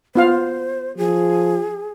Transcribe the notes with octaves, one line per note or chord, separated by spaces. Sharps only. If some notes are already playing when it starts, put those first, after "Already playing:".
B3 F4 C5 F5
F3 G#4